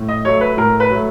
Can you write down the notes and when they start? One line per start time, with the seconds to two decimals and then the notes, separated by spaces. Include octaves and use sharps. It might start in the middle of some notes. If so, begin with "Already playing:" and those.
Already playing: A2
0.09 D#5
0.25 F#3 A3 C#5
0.41 B4
0.57 A2 A#4
0.80 B4
0.90 F#3 A3